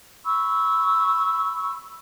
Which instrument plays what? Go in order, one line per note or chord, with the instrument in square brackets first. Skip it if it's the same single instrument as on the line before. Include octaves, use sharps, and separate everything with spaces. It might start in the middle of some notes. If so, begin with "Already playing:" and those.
[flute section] B5 C#6 E6